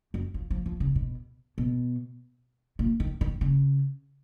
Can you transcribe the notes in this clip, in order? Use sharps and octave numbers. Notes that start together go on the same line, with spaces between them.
F#2
F3
F3
F3
C#3
B2
B2
A#2
D#3
D#3
C#3